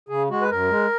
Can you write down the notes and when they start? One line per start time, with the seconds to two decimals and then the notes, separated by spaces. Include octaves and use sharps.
0.09 C#3 G#4
0.30 G#3 F#4
0.41 B4
0.50 F#2 A#4
0.70 G#3